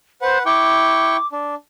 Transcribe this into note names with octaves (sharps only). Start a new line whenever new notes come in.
B4 C5 F#5
E4 G5 C#6 D6
D4